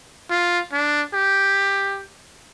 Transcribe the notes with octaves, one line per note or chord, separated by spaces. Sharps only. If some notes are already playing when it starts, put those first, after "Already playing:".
F4
D4
G4